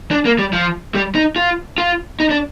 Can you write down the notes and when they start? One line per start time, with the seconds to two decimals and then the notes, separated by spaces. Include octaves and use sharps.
0.11 D4
0.25 A#3
0.39 G3
0.53 F3
0.95 G3
1.15 D#4
1.36 F4
1.78 F4
2.20 D#4
2.31 D4